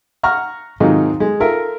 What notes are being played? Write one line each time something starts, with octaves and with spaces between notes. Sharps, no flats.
F#5 A#5 C#6 F6
G#2 C3 D#3 F#3 D#4 F4
G#3
F4 A4 A#4 E5